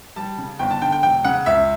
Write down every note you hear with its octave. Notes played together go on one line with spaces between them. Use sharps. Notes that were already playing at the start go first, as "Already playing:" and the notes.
G3 A5
C#3
G1 G5
A5
D3 G5
G5
E1 G5
C#3 F#5
C#2 E5